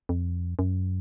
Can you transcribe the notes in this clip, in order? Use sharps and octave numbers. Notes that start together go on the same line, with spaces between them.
F2
F#2